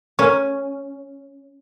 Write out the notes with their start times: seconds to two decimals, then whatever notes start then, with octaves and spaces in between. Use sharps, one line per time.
0.19 C#4 A#4 C#6